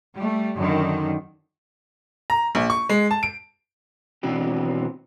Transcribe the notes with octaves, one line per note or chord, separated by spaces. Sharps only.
G3 A3
F#2 D3 D#3
A#5
A#1
C#6
G#3
A5
D7
B2 E3 C4 D4 F#4 G4